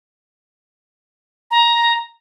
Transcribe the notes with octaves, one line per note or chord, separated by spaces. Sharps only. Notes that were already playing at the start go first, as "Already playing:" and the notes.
A#5